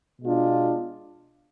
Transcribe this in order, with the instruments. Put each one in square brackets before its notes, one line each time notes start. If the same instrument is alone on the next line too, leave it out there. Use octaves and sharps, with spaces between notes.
[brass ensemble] B2 G#3 D4 F4